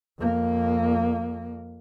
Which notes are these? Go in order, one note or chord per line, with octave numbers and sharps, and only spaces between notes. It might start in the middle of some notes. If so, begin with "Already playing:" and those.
F2 A#3